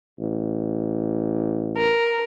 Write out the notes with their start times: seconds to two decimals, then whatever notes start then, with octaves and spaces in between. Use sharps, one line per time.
0.19 A1
1.77 A#4